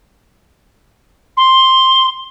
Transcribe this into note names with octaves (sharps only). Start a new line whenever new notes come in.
C6